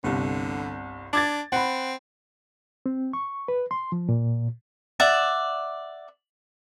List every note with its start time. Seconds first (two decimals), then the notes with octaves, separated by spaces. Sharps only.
0.04 G1 C2 D3
1.13 D4 D6 G#6 A6
1.52 C4 F#5 B5
2.86 C4
3.13 C#6
3.48 B4
3.71 C6
3.92 F3
4.09 A#2
5.00 D5 E5 F#5